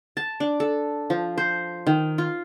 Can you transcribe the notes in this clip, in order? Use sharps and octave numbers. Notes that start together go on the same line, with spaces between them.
A5
D4
A4
F3
C5
D#3
F4